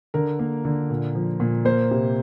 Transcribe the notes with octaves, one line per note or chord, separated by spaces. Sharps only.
D3 A#4
A#3
D3
A#2
F3
A#2
A#3 C5
C3